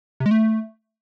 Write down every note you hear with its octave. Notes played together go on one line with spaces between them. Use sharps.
C3
G#3
A3